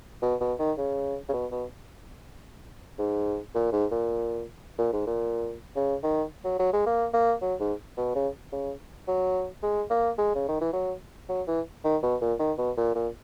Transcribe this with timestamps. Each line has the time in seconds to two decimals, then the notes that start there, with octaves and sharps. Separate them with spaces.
0.22 B2
0.41 B2
0.59 D#3
0.78 C#3
1.29 C#3
1.33 B2
1.51 B2
2.99 G#2
3.54 A#2
3.72 G#2
3.91 A#2
4.78 A#2
4.93 G#2
5.07 A#2
5.76 C#3
6.03 D#3
6.44 F#3
6.59 F#3
6.73 G#3
6.86 A#3
7.14 A#3
7.42 F#3
7.60 G#2
7.97 B2
8.15 C#3
8.52 C#3
9.08 F#3
9.63 G#3
9.91 A#3
10.18 G#3
10.35 C#3
10.48 D#3
10.61 E3
10.73 F#3
11.29 F#3
11.47 E3
11.84 D#3
12.03 B2
12.21 A#2
12.39 D#3
12.58 B2
12.77 A#2
12.95 A#2